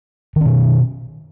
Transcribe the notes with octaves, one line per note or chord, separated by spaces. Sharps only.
B2 D#3 C#4